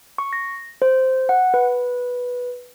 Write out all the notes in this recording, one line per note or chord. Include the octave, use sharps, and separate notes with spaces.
C#6
A#6
C5
F#5
B4